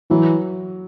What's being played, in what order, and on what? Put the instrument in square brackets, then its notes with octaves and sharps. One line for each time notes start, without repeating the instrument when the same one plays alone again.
[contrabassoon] E3 [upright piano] F#3